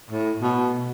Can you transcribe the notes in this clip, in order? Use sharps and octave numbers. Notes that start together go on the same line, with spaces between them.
A2
B2